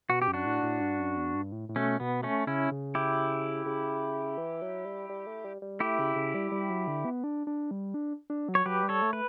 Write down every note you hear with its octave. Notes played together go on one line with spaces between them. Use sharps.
B2 F#4
G4
F#2
D4 F#4
A2
A2
G2
F#2
E2
G2
A2
A2
B2 A3 C#4
B2 B3
A3 C#4
C#3 C#4 E4
C#3
E4 G4
C#3
E3
F#3
G3
G3
A3
G3
G3
A3 E4 G4
C#3
C#3
G3
G3
F#3
D3
B3
D4
D4
G3
D4
D4
F#3
C#5
F#3 G4 B4
G3
A4 C#5
A3
B4